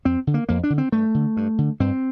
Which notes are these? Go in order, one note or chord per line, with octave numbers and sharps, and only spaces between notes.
F2 C4
D3
A#3
F2 A#3
D4
D3
C4
G2 A3
D3
G2
D3
G2 C4